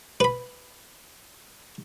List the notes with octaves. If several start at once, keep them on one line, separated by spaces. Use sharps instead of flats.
B4 B5